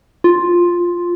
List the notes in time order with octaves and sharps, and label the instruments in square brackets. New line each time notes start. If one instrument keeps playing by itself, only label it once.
[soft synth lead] F4